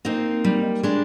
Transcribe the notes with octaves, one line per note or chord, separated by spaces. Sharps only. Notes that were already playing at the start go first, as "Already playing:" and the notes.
A#3 C4 D#4
G3
G#3 D4